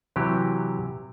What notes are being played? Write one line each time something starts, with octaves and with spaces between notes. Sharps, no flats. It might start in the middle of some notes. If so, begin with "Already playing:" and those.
C3 E3 F#3 G4